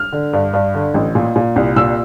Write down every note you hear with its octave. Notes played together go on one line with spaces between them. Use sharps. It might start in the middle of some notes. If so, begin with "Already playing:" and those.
Already playing: F6
D3
G2
G2
D3
A1
A#2
A#2
C2
A#2 E6